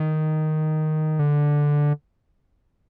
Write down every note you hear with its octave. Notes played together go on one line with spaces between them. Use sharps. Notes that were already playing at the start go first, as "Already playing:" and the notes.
Already playing: D#3
D3